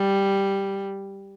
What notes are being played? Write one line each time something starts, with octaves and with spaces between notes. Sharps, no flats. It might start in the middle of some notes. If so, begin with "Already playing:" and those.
Already playing: G3